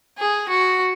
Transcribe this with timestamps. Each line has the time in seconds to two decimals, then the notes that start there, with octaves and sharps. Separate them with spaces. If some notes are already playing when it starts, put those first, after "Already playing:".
0.18 G#4
0.49 F#4